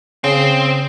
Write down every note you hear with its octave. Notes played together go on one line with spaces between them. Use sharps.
C#3 C4